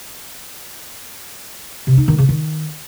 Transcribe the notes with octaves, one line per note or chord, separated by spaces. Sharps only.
C3
D#4
D#3
C#3
D#3